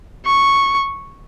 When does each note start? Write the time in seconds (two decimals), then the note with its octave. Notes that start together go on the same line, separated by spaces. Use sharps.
0.26 C#6